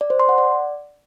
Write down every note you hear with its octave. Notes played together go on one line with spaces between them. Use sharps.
D5
C5
C6
F#5
D5